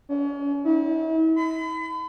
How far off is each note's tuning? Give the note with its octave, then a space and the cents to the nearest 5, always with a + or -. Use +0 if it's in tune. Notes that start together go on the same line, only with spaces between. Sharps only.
C#4 +40
E4 -40
B5 +40